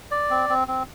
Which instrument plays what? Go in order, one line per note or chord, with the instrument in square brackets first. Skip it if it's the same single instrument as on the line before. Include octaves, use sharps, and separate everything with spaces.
[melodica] D5
C4
C4
C4